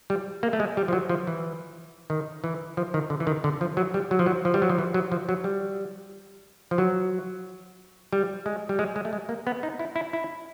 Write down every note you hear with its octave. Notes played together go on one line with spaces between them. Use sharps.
G3
A#3
A3
G#3
G3
F3
F#3
F3
E3
D#3
E3
F3
D#3
D3
E3
D#3
D3
F3
F#3
G3
F#3
F3
F#3
F3
G3
F#3
F3
E3
F#3
F3
F#3
G3
F3
F#3
G3
G#3
G3
G#3
G#3
A3
G#3
A#3
B3
D#4
E4
E4
E4